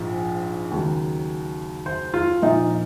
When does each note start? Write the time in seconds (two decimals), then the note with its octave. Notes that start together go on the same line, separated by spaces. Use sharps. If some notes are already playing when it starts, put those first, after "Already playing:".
Already playing: A#1 G#2 F3
0.71 D#2 C#3 F#3
1.86 C5
2.14 F4
2.42 A#1 A#2 F3 D#4